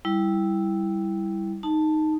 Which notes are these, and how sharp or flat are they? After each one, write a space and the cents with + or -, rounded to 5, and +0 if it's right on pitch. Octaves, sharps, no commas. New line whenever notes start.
G3 +0 E4 -5
D#4 +0 A5 +0